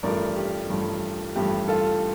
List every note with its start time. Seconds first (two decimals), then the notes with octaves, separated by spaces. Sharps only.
0.03 A1 G2 F3 A3 A#4 D5
0.36 G4
0.69 A1 G2 F3 A3
1.35 A1 G2 F3 A3 G4
1.68 F4 A4